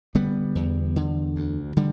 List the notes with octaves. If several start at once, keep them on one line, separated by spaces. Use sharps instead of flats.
D3 G3 B3
E2
D3
D2
D3 G3